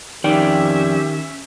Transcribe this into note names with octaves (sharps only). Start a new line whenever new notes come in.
F2 D#3 C#4 G4 D5 E5 G5